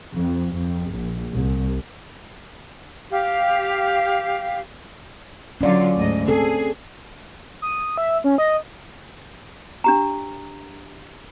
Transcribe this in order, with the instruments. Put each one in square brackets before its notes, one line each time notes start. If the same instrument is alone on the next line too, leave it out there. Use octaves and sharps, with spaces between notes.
[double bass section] F2
F2
A#1
C2
[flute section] G4 F5
[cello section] D3 F#3 F4 [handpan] C#4 D5
[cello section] D2 G#2 D#5
[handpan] C4 A4 [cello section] G#4
[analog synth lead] D#6
E5
C#4
D#5
[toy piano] D4 G4 A#5